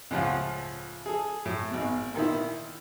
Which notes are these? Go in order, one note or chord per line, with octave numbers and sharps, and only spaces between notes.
C#2 A2 F3 F4 F#5
G#4 A4
A2
G#1 B2
A#2 D#3 D#4 E4